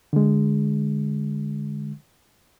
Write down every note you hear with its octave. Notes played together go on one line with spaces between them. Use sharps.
D3 G#3